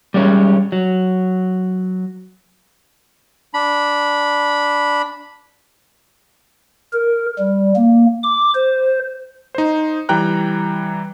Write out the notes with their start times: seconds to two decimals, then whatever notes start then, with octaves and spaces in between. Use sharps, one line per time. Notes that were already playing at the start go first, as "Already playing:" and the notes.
0.14 G3 G#3 C#4 C#5
0.72 F#3
3.54 D4 B5
6.92 A#4
7.39 G3
7.76 A#3
8.23 D6
8.55 C5
9.55 D#4 C5
10.09 E3 G3 G5 A#5 F#6